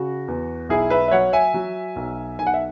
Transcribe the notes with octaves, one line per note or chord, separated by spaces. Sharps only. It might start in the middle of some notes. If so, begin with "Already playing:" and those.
Already playing: C#3 F#4
E2
B1 E4 G#4
B4 E5
E5
F#3 C#5 F#5
E5 G#5
F#3
B1
B1 G#5
F#5
E5